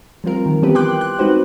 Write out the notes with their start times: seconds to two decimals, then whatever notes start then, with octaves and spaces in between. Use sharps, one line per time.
0.24 F3 G3 C4 F4 A#4
0.46 D#3
0.62 E3 F3 B3 C4 G4 B4
0.75 G5 C6 D6 F#6 G6
1.01 F#6
1.19 G#3 C4 D#4 F#4 B4 C5